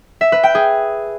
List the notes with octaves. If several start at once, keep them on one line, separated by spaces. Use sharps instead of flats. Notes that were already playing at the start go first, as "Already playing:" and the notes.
E5
B4
G5
G#4